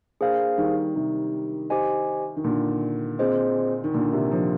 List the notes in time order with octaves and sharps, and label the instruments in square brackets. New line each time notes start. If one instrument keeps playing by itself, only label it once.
[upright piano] A#3 D4 [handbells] G#4 C5 F5
[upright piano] D#3 G3
C3 D#3
[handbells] G4 C5 D#5 G#5
[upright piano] D#3
A#2 D3
[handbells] C4 F4 G#4 C5 D#5
[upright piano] D#3
A#2 D3
C3 D#3
D3 F3